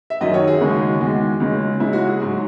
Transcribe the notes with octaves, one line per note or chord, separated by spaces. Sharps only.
E5
F#2 D#3 F#3 D#5
C#5
G#4
D#2 C#3 G#3 F#4
E2 D#3 G#3
C#2 C#3 G#3
C#2 C#3 G#3 E4
F#4
G#4
G#2 F#3 F#4